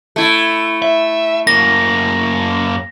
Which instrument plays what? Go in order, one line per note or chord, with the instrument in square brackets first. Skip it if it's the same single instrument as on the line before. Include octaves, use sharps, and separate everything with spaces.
[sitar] A3 E4
[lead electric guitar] E5
[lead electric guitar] F#2 A#3 [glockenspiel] A#6